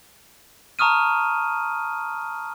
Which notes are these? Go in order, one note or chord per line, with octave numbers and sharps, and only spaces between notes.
A5 A#5 C#6 D#6 F6 D#7